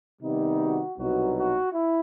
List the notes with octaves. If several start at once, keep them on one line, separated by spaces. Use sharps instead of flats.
C3 D#3 G3 B3 D#4
F#4
C2 B2 F#3 B3 D#4 F#4
F#4
E4